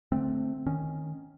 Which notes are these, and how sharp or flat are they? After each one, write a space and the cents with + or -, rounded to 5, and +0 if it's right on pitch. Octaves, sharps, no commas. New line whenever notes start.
D3 +0 A3 +0 C4 +0
D#3 +0 C#4 +0